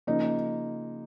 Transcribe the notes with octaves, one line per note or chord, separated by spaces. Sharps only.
C#3 F3 A#3 D#4